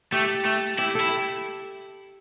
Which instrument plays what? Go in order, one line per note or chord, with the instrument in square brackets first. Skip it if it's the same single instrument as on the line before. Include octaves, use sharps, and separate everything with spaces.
[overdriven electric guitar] A3 [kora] G4
[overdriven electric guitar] A3
[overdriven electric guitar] E4 [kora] G4
[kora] A4
[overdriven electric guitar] E4